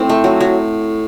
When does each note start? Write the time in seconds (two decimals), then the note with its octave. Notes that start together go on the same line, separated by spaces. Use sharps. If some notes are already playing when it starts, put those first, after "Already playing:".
Already playing: A2 C4
0.09 A3
0.24 F#3
0.40 F#3